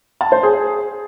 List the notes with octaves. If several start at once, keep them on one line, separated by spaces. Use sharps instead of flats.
A5
C5
G#4